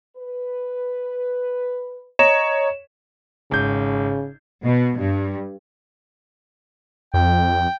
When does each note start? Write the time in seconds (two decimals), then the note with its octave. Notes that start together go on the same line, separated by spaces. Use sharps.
0.17 B4
2.19 C#5 D#5 A#5 E7
3.51 G#1 C#3 G6
4.63 B2
4.98 G2
7.14 F2 G5